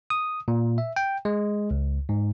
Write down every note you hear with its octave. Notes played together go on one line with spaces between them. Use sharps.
D#6
A#2
E5
G5
G#3
C#2
G#2